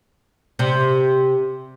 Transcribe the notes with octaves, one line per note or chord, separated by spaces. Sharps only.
C3